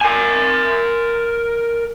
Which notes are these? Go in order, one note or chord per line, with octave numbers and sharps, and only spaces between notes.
A#4 G#5